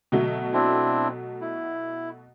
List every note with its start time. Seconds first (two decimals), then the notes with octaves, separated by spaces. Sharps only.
0.12 B2 F#3 A3
0.53 C4 D4 E4
1.41 E4